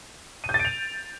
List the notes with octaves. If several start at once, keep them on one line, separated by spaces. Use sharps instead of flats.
D#7
G6
A6
D7
F7